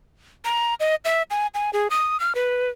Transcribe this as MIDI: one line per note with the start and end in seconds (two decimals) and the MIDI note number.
0.45 0.74 82
0.80 0.95 75
1.05 1.23 76
1.30 1.47 80
1.54 1.70 80
1.73 1.88 68
1.90 2.20 87
2.20 2.33 89
2.35 2.70 71